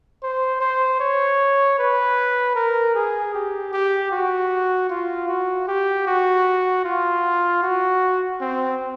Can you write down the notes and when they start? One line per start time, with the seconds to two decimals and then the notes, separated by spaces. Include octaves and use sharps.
0.23 C5
0.61 C5
1.00 C#5
1.79 B4
2.55 A#4
2.95 G#4
3.34 G4
3.73 G4
4.12 F#4
4.90 F4
5.29 F#4
5.68 G4
6.07 F#4
6.85 F4
7.63 F#4
8.41 C4